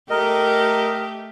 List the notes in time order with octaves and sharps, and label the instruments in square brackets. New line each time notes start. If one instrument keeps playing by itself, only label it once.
[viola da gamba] A3 G4 [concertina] A#4 D#5